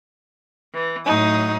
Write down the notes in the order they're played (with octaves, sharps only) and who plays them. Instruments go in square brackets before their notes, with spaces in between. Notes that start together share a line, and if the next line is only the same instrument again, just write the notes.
[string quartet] E3
[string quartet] A2 F#3 D#6 [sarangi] D#4